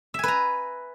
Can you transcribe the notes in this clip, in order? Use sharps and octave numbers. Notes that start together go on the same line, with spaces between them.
B4 E5 G#5 A#5